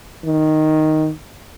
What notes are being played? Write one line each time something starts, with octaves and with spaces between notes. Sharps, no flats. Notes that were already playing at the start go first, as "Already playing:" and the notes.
D#3